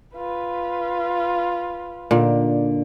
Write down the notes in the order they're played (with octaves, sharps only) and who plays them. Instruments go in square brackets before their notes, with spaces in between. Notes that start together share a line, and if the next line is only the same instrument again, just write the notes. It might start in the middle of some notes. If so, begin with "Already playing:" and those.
[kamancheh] F4 B4
[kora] A#2 [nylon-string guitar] D3 D4 D#4